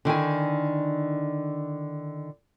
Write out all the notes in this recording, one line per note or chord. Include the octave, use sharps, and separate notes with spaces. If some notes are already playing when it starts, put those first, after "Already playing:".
D3 D#3 E4 G#5